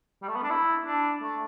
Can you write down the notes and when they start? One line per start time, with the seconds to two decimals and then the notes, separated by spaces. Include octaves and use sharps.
0.22 G3
0.28 A3
0.35 B3
0.43 D4
0.50 E4
0.86 D4
1.23 A3